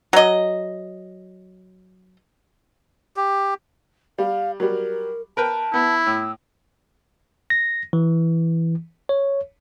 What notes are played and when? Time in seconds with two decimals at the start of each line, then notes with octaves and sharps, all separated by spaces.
0.13 F#3 D#5
3.17 G4
4.18 G3 F5
4.60 F#3 G3 A#4
5.37 A#4 B4 G5 A5
5.74 B3 E4
6.07 A2 E6
7.50 A#6
7.93 E3
9.09 C#5